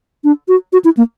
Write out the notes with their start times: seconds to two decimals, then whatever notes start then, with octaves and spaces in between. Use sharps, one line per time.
0.24 D4
0.48 F#4
0.73 F#4
0.84 E4
0.97 A#3